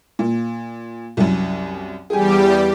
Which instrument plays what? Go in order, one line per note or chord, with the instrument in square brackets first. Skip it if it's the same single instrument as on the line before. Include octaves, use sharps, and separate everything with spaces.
[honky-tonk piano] A#2
C2 F#2
[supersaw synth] E2 G3 G4 [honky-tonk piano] G#4 G#5